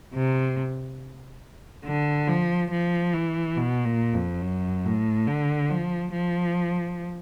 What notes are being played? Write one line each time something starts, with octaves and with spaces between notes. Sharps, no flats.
C3
D3
F3
F3
E3
B2
A#2
F2
F#2
A2
D3
F3
F3